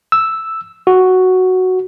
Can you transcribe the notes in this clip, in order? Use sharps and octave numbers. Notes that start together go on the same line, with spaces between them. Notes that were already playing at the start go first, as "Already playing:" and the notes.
E6
F#4